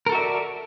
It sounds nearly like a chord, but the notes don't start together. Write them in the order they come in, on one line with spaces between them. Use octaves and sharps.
A#4 A4 F#4 E5 D5